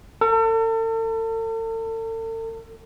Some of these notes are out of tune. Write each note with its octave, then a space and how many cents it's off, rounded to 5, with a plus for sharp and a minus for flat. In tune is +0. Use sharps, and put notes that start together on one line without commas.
A4 +40